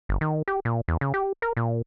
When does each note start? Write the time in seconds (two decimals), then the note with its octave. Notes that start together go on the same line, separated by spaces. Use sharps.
0.09 G1
0.21 D#3
0.48 G4
0.65 A#2
0.88 E2
1.01 C#3
1.14 G4
1.42 A#4
1.57 A#2